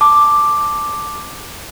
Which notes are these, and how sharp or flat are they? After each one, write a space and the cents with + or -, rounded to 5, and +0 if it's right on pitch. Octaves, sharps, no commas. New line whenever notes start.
A5 +0 D6 +5